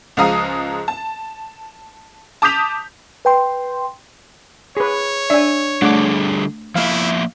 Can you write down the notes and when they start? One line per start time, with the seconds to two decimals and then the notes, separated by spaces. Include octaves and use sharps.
0.17 C#2 F3 G#3 F5 A#5 D#6
0.88 A5
2.42 A5 D6 D#6 G6 B6 F7
3.25 B4 G5 C6
4.77 G#4 B4 C#5
5.30 D4 D5 E5 G#5
5.82 D3 G3 A3 D4 G#4 D6
6.75 F3 A#3 E4 E5 F5